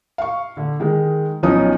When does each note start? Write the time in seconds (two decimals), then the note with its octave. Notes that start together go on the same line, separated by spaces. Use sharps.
0.18 F5 C#6
0.57 D3
0.80 D#3 G#3
1.43 B1 F3 C#4 D#4 D#6